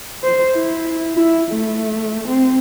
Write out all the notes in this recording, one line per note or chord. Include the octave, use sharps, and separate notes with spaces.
C5
E4
E4
A3
C4